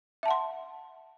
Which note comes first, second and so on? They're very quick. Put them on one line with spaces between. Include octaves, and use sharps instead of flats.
E5 A5 F#5 C6